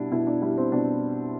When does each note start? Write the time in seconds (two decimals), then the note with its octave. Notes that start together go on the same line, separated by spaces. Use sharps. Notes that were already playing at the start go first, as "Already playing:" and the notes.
Already playing: B2 G3 D4 E4
0.12 B2 E4
0.27 D4
0.42 G3 E4
0.57 C4
0.72 B2 D4